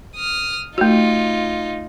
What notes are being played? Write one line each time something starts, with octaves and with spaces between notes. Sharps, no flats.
D#6 F6
A3 D#4 F4 F#4